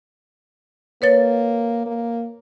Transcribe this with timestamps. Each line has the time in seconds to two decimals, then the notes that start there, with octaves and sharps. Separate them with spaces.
1.02 A#3 B4 C#5 A6
1.86 A#3